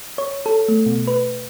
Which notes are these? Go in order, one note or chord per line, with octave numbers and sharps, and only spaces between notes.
C#5
A4
A3
B2
B4